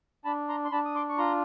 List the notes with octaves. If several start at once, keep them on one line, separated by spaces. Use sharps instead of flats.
D4 A5 B5
A#5 C6
C6
D4 A5 B5
D#6
C6 D6
C#6
F4 A#5 C6